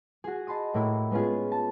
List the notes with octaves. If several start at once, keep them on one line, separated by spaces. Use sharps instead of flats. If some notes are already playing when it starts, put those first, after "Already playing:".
F#4 G#4
D#5 A5 B5 C6 D#6
A2 A#3 E4 B5
G#3 B3 C#4 F4 G#4
A5